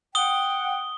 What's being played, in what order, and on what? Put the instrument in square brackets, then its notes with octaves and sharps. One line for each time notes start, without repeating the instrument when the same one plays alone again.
[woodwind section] F#5 G5 [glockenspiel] D#6 G7